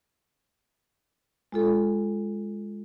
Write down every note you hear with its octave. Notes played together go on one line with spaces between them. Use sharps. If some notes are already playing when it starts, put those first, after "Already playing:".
G#3 F4 A4